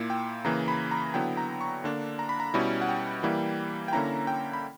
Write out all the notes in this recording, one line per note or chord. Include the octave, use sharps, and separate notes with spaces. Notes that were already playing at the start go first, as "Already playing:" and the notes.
Already playing: A#2 A#3 E4
G5
C#3 E3 A#3 A#5
B5
A#5
D3 F#3 B3 E4 G5
A#5
C#6
D3 A#3 D4
A#5
B5
A#5
B2 G3 C#4 E4
F#5
G5
E3 G3 A#3 E4
G5
D3 A#3 C#4 E4 A#5
G5
B5